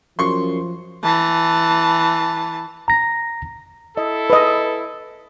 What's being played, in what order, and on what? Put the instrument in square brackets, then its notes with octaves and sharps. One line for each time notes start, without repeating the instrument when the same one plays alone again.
[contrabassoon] F#2 [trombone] F3 [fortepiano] C6 C#6
[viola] E3 A5
[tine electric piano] A#5 A#6
[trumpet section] E4 A4 [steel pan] D#5
[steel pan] B4 D#5